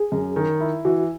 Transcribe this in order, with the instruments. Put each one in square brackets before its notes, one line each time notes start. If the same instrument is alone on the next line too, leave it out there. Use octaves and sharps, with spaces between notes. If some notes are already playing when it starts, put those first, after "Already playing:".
Already playing: [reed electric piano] G#4
[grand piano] F#2
D#3
E4
[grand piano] E3 [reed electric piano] F#4